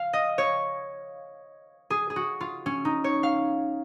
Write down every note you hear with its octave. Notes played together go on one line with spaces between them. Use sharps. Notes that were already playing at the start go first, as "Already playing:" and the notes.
Already playing: F5
D#5
C#5
G#4
G#4
F#4
F4
C#4
D#4
C#5
F5